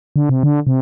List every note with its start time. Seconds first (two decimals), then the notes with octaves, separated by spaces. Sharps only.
0.16 D3
0.29 C3
0.43 D3
0.67 C3